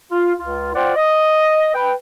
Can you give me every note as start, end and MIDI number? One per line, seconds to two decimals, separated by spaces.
0.11 0.33 65
0.38 0.70 37
0.38 0.70 65
0.74 0.95 65
0.74 0.95 72
0.74 0.95 74
0.74 0.95 78
0.74 0.95 79
0.96 1.70 75
1.74 1.92 71
1.74 1.92 79